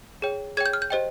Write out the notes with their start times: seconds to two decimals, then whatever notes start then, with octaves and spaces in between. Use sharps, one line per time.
0.22 G#4 C#5 G5
0.57 G#4 C#5 G5 G#6
0.66 G6
0.73 F6
0.82 G6
0.90 G4 C5 D#5 G5